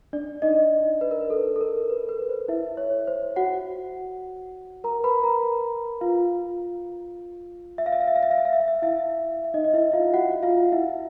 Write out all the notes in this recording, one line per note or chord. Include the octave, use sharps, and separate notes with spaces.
D4 D5
D#4 D#5
B4
A#4
B4
A4
A4
A#4
B4
B4
B4
C5
E4 E5
C#5
C5
F#4 F#5
A#4 A#5
B4 B5
A#4 A#5
F4 F5
E5
F5
E5
F5
E5
F5
E5
F5
E5
F5
E5
F5
E5
F5
E4 E5
E5
D#4 D#5
D#5
E4 E5
F4 F5
F#4 F#5
F4 F5
E4 E5